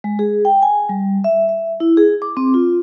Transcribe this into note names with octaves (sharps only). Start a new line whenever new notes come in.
G#3
G#4
G5
G#5
G3
E5
E5
E4
G#4
D6
C4
F4